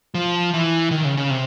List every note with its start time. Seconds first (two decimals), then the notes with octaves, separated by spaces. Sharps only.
0.15 F3
0.54 E3
0.91 D#3
1.05 C#3
1.17 C#3
1.30 C3